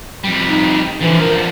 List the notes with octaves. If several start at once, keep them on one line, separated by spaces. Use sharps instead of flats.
F2 G3
D#4
D3 E3 F3
A#4